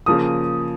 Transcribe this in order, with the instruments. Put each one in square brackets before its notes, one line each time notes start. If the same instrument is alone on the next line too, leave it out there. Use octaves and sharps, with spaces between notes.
[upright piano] C#3 F3 A#3 D#6